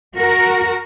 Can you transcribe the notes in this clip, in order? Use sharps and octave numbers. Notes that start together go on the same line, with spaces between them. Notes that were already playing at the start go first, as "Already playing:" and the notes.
F#4 A#4